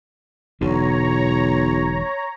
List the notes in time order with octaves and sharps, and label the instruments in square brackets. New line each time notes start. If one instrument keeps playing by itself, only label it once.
[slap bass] E1 B2 D3 [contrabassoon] B1 [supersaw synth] C#5 A#5